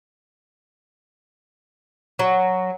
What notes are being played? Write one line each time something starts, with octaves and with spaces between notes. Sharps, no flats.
F#3